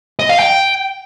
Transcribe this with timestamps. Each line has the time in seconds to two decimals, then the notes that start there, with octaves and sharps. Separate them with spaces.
0.19 D#5
0.29 F5
0.39 G5